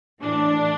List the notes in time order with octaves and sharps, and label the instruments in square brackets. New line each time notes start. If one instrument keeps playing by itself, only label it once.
[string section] A2 E3 D4